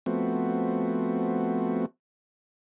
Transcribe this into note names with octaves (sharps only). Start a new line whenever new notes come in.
F3 A3 B3 C4 F#4